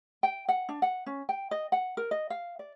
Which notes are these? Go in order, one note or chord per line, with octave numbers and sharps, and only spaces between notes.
G5
F#5
D4
F#5
C#4
G5
D#5
F#5
A#4
D#5
F5
D5